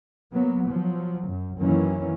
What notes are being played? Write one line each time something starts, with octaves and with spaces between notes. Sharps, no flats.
F#3 A#3 B3
F3 F#3
F#2
F#2 D#3 E3 F#3 A#3 C#4